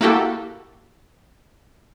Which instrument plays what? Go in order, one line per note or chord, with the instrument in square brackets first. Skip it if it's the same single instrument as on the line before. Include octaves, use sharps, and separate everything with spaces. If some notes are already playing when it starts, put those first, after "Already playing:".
[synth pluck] A#3 E4 F#4 G4 A4